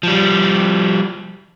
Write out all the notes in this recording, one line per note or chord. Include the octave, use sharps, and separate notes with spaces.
F3 G3